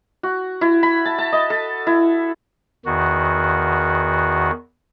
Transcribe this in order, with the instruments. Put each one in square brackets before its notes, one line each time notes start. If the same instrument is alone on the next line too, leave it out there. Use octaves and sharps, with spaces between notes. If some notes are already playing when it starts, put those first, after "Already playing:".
[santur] F#4
E4
B5
A5
A5
D#5
A4
E4
[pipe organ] E2 D#3 F#4